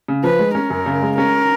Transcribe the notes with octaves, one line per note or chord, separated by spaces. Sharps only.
C#3
F3 B4
G#3
C#4 A#4
F#2
C#3
G#3
C#4 A#4